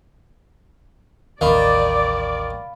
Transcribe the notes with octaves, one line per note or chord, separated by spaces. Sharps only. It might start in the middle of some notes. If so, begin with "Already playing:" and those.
A1 D#2 D#3 D5 F5 B5